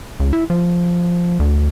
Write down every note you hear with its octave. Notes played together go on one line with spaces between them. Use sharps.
C#2
E4
F3
D2